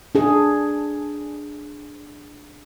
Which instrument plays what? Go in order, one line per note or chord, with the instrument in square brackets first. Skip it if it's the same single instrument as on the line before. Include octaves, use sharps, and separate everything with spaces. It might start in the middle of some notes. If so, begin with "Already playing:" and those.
[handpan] D4 G#4